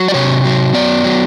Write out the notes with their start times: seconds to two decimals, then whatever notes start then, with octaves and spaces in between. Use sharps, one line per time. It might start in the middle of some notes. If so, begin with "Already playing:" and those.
Already playing: F#3
0.08 D5
0.14 C3 C#5
0.44 F#3
0.74 B3 D5
1.04 F#3